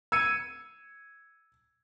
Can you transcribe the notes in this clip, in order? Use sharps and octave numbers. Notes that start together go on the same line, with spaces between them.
E6 G#6 C#7 D#7